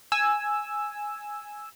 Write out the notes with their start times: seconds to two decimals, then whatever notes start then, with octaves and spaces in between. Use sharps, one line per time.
0.12 G#5 E6